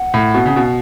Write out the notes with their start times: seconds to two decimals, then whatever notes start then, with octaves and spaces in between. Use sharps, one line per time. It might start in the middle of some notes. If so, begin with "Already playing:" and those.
Already playing: F#5
0.14 A2
0.34 B2
0.46 C#3
0.56 B2